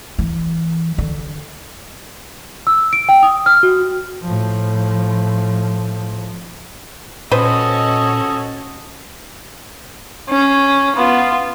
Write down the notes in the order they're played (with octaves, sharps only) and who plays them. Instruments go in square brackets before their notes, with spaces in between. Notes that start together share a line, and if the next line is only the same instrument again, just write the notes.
[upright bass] E3
D3
[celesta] E6
D7
G5
D#6
F6
F#4
[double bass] A2 F3
[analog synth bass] A#2 [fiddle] C#4 F#4 [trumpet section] A4 D#5 [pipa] B4 C5
[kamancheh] C#4
B3 F4